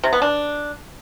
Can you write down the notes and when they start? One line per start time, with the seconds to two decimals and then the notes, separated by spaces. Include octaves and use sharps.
0.04 C3
0.13 B3
0.22 D4